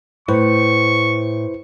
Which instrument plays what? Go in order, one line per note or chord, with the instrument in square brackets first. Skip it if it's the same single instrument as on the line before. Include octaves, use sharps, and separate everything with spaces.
[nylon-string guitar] A2 [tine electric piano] E4 B4 C5 [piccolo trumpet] C#6